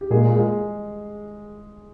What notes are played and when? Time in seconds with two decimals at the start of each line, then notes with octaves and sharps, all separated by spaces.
0.01 G4
0.10 A#2 G#3 G#4
0.35 G#3 G#4